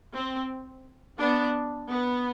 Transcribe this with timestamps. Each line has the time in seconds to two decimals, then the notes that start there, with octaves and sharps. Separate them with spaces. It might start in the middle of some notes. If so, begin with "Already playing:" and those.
0.14 C4
1.18 B3 D4
1.89 B3